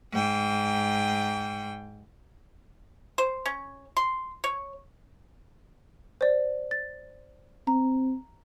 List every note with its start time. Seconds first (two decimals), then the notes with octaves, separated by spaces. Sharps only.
0.12 G#2 G5
3.18 C5
3.46 C#4
3.97 C6
4.44 C#5
6.21 C5 D5
6.71 A6
7.67 C4 A#5